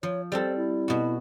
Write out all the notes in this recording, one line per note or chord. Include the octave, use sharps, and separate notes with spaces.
F3 C#5
G3 C4 A4 C5
E4
B2 F#4